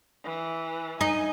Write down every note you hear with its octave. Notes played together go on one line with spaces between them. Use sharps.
E3
D#4 G#5